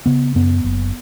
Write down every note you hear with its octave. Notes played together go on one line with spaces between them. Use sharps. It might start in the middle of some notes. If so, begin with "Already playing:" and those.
C#3 B3
F#2 B3
F#1